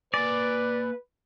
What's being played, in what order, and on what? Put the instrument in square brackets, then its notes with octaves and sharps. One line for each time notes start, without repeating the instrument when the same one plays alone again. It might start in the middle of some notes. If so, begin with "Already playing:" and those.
[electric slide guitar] A#3 G#5 [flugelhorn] B4 [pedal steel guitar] D5